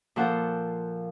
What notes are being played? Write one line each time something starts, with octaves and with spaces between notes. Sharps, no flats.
A#2 F3 A4 C5 F#5